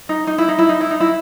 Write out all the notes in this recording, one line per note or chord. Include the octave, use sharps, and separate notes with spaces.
D#4
D#4
E4
D#4
E4
D#4
E4
D#4
E4